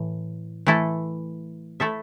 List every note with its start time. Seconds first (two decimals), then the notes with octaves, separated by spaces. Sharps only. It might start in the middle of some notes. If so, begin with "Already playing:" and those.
Already playing: A2 E3
0.67 E3 A3 E4 A4
1.80 A3 E4 A4 E5